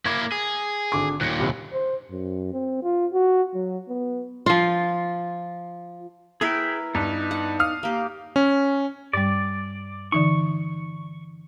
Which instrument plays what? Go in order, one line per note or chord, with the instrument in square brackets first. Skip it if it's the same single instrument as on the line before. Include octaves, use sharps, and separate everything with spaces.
[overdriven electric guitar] A#3 E4 [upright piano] D6 G#6 A#6
[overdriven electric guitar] G#4
[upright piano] G#1 D3 D6
[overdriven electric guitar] D#2 A#2 [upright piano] F#6 A#6 C#7
[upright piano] F1 C2 C#7
[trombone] C5
F#2
C4
F4
F#4
F#3
B3
[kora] F3 F4
[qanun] E4 A#4 B4 [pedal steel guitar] G#4 E5 G5
[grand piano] G2 [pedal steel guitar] B3 D#4
[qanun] F#5
[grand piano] F5 D#6 F6
[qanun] A#3 G4
[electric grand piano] C#4
[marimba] G2 G3 [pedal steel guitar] D5
[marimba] D3 E3 D#4 [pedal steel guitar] C#6